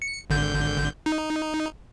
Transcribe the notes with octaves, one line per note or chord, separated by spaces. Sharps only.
C#7
G#1 D3 G6
D#4